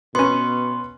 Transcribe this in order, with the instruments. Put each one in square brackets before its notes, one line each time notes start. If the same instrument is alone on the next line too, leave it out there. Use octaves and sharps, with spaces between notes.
[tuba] B2 [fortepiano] B3 C#4 [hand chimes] C6